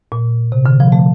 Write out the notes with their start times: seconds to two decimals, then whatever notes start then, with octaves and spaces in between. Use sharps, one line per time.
0.12 A#2
0.52 C3
0.66 D3
0.80 F3
0.92 A3